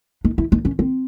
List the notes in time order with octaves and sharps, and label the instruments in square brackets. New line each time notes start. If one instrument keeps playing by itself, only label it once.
[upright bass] D#4
E4
D#4
C#4
C4